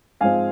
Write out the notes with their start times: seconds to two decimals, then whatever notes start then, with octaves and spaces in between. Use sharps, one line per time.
0.21 G#2 F3 G#3 C4 F5 G#5